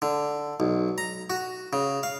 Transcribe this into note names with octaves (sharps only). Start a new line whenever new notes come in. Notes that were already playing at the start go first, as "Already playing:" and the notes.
D3
B1
A#5
F#4
C#3
F5